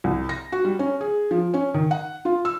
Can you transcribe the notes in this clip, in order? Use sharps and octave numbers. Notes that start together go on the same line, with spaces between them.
C2
A#6
F#4
G3
C#4
G#4
F3
C#4
D#3
F#5
F4
E6